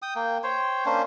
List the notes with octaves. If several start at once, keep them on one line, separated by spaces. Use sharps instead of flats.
G5 D#6
A#3 G5
C5 C#5 G5
A#3 C#4 D4 C5